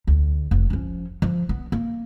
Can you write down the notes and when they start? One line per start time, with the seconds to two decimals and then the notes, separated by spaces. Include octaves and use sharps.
0.07 D2
0.51 F1
0.70 F3 C#4
1.22 F3
1.49 B3
1.72 A#3